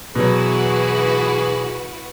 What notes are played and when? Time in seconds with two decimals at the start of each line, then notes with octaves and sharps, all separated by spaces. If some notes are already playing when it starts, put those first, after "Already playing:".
0.15 B2 E3 F#3 E4 F#4 G#4 B4